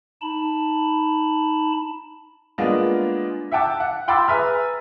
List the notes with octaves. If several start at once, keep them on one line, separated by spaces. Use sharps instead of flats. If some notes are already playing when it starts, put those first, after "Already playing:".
D#4 A5 B5
G#3 A#3 B3 D4 F4
E5 F#5 G5 A5 D6
F#5
G5 B5 C6 D6 E6 A6
G#4 B4 E5 A#5 F6